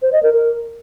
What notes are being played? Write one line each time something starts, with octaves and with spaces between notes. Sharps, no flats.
C5
D#5
A#4
A#4